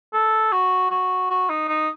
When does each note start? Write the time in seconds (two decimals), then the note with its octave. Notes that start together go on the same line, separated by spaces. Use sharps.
0.13 A4
0.52 F#4
0.91 F#4
1.30 F#4
1.49 D#4
1.68 D#4